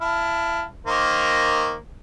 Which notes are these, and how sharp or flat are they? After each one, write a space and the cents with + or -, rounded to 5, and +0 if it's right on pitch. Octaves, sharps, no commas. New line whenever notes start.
E4 +25 F5 +0 A5 +0
D#3 +0 A#3 +0 C5 +0